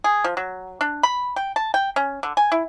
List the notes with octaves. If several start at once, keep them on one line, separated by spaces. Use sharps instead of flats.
G#4
F3
F#3
D4
B5
G5
A5
G5
C#4
D3
G#5
E4